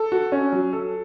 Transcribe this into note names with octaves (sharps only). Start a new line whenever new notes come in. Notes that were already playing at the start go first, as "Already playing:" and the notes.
Already playing: A4
F#4
C#4
F#3
A4